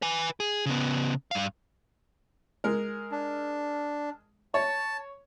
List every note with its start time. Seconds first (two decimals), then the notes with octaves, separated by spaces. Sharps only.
0.02 B4 G#5
0.40 G#4
0.66 C#3 B3
1.31 G2 F5
2.64 G#3 A#4
3.11 D4
4.54 C#5 A5